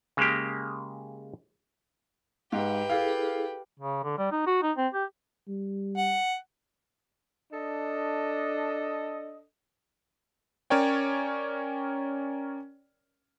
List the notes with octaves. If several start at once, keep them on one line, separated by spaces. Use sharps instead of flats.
C#3 G#3 A#3 G4
G#2 G4 B4 F5
E4 G#4 A4 F5
C#3
D3
G3
D#4
F#4
D#4
C4
G4
G3
F#5
D4 A4 D#5
C#4 A#4 C#5 D5 G5